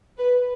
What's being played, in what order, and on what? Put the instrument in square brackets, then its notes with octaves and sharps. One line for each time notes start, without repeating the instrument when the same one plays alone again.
[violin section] B4